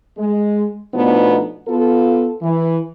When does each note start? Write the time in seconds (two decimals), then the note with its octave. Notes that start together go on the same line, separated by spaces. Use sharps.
0.18 G#3
0.94 B2 F3 A3 B3 D4 D#4
1.68 B3 F4 A4
2.42 E3